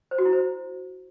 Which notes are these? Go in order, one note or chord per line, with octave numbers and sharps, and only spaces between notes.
C5
F#4
E4
C5